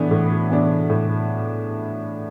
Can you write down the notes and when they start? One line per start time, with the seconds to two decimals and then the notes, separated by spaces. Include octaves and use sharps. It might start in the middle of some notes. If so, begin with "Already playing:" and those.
Already playing: A2 E3 B3 D4
0.11 A2
0.50 E3 B3 D4
0.89 A2